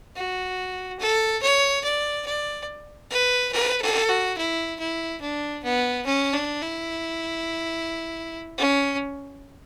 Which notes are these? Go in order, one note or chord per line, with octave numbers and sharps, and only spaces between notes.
F#4
A4
C#5
D5
D5
B4
B4
A4
F#4
E4
E4
D4
B3
C#4
D4
E4
C#4